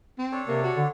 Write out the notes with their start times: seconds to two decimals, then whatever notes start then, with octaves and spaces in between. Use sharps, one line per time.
0.18 C4
0.32 D4 A4 C#5
0.48 C3 A#3
0.64 F#4
0.77 D3